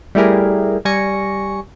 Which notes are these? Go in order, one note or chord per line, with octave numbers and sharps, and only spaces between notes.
G3 A3 E4 G4 G#4 A#4
G3 G#5 C#6 A#6 C#7